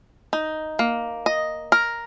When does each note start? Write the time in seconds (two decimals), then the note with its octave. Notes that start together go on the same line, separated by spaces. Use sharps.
0.33 D#4
0.79 A#3
1.26 D#5
1.72 A#4